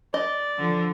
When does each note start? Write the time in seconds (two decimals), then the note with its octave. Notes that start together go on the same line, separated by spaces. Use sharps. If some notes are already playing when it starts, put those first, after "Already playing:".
0.14 D5 D#5
0.58 D3 F3